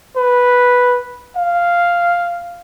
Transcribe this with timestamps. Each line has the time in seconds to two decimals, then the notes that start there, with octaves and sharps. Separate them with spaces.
0.16 B4
1.36 F5